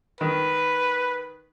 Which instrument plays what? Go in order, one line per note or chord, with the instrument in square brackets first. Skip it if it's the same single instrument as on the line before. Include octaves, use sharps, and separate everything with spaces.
[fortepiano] D#3 [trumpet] B4